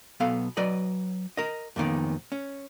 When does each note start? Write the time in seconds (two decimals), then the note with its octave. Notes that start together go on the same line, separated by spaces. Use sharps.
0.20 B1 B3 A4 F5
0.57 F#3 B4 D5 D#5
1.37 A#4 D#5
1.76 F2 A#2 D#3 B3
2.32 C#4